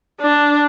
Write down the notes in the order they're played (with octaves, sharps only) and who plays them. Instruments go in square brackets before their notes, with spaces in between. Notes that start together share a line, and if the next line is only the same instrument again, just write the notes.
[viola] D4